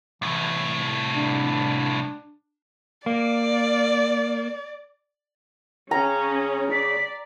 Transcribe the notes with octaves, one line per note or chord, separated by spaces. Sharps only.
C2 A2 E3
D4
A#3 D5
C#3 C#4 A#5
D5 B6